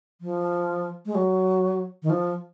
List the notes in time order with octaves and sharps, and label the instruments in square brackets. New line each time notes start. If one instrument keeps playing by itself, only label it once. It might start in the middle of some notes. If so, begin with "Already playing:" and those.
[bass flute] F3
G#3
F#3
D#3
F3